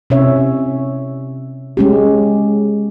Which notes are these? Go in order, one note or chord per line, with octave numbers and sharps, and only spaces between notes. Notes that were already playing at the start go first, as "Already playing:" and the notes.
C3 C#4 C#5 E5
G#3 C#4 G4